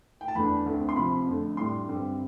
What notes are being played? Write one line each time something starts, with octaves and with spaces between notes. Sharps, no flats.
G5
A5
E2 D3 A3 D4 B5
D2 D3 A3 C4
C6
C3 F3 C4 B5
F2 D3 A3
A2 G3 D4 C6
G2 D3 G3 C4